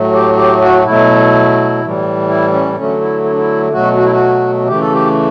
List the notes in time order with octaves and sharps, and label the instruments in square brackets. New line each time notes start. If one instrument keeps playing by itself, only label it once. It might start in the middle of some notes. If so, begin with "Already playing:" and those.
Already playing: [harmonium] A2 F#3 A3
G4
G4
F#4
B2 F#3 A3 E4
A2 E3 G3
E4
C#4
D3 F#3 A3 C#4
E4
E4
D4
E4
B2 F#3 A3 F#4
F#4
E4
F#4
C#3 E3 A3 G4
A4
G4